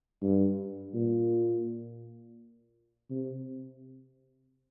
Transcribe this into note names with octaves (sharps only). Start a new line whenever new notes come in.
G2
A#2
C3